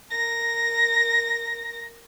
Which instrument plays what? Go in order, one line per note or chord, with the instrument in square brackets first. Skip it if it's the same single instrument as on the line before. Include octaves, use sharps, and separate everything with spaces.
[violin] A#4 A#6